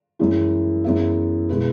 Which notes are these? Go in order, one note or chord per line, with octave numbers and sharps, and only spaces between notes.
F#2 E3 G#3
F#2 E3 B3 G#4 E5
B2 G#3 E4 B4